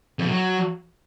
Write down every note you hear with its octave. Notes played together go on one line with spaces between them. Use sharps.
F2
B2
F#3